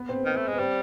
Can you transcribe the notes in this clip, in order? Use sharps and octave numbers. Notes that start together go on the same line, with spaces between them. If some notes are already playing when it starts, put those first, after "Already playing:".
Already playing: B3 B4
C4 C5
D#3
A3
G#3
B4
G3 C4 C5